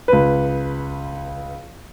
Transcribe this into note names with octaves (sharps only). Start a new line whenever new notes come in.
C#2 B4